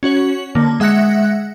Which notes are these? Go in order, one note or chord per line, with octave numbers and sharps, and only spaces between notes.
C#4 F#4 C#5 F#7
D3 A#3
G#3 E5 F#5 F#6 A#6 C#7